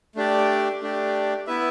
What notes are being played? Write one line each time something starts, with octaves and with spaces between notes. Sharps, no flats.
A3 D4 G4 D5
A3 D4 G4 D5
B3 E4 B4 E5